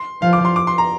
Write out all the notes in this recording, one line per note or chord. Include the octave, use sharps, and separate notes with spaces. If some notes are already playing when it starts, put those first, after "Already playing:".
Already playing: C6
F3 F5
D6
C6
D6
C6
A#5